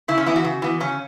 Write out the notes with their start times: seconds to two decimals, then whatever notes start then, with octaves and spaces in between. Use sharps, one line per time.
0.08 C#3 E4
0.18 C#4
0.26 E3 B3 E4
0.36 F#4
0.44 C#3
0.62 E3 B3
0.80 C#3 C#4